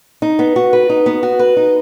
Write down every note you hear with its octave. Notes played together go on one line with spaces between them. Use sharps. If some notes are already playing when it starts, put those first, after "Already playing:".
D#4
B3
F#4
B4
D#4
B3
F#4
B4
D#4